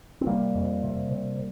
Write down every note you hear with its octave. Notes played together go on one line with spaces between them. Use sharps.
C4
C3 G3 A#3
F2
C3
C3